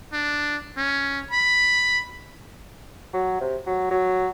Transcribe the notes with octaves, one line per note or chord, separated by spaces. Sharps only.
D4
C#4
B5
F#3
C3
F#3
F#3